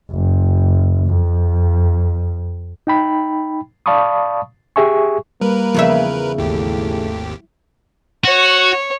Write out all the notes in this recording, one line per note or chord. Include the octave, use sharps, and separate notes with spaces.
F#1
F2
D#4 G5 B5
D5 F5 A5 B5 C#6 D#6
G4 G#4 E5 G#5 C#6
G3 A#3 A#4 B4
E2 C#3 F3 E5
G#1 D#2 A3 E4 G4
F#4 C#5